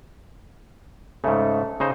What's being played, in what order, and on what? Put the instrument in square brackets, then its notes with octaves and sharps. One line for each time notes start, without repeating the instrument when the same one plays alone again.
[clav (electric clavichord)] G#2 C#3 [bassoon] A3
[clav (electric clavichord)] C#3 D#4 C5